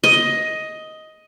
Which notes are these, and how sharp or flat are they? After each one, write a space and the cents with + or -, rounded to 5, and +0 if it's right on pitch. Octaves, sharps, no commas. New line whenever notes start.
D#5 +10